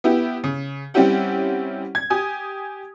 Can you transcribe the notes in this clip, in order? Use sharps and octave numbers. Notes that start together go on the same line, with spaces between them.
B3 E4 G4
C#3
G3 C4 C#4 E4 G4 F#5
G#6
G4 G#5 D#6